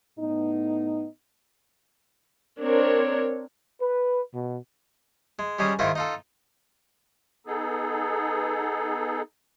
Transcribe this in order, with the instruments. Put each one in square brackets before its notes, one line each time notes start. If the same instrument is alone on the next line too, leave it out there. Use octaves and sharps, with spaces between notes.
[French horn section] A2 B3 D#4
[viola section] C4 D4 A#4 C#5
[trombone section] B4
B2
[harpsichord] G#3
G3 G#3 C#4 G#4
G#2 D#3 E4 F4 A#4
D#4 F4 A4
[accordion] B3 D#4 G#4 A4